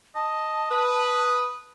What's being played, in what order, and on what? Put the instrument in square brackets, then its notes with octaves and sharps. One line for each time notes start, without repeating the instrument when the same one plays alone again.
[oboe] D#5 [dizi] A5
[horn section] B4 [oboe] D#6